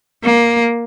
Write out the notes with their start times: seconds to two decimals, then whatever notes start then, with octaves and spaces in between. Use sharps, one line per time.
0.24 A#3